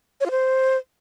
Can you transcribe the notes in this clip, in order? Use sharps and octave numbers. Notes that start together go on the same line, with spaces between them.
C#5
F4
C5